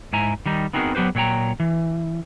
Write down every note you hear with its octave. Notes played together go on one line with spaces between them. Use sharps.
G#2 E4 G#5 A#5
D#3 G3 D#4
B3 C4 D#4 F#4 G#4 A#4
F#3 B3 G4 B4 C5
A#2 F#3 C#5 G5 A#5
E3